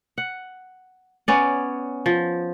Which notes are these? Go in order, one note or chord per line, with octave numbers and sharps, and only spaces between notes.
F#5
B3 C#4 D5
F3